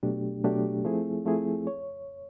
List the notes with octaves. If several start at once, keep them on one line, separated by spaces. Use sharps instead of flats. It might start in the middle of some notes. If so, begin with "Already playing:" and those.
B2 F#3 A3 D4 G4
B2 F#3 A3 D4 G4
F3 A3 C4 E4 G#4
F3 A3 C4 E4 G#4
C#5